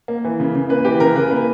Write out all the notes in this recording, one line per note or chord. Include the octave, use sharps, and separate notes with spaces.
A#3
E3
C#3
C#3
A#3 B4
E3 G4
C#3 A#4
C#3 B4
A#3 B4